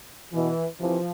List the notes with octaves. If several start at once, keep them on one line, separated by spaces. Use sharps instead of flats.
B2 E3
C3 E3 F3